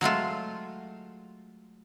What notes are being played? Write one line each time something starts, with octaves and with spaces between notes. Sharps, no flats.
F#3 G#3 A3 F4